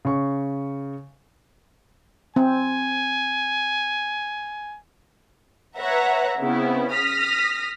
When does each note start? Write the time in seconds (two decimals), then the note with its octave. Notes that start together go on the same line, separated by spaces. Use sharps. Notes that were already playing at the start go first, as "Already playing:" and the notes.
0.05 C#3 C#6
2.36 C4 G#5
5.78 B4 C#5 E5 F#5 A#5
6.39 C#3 B3 C4 E4
6.92 D#6 F6 A#6 B6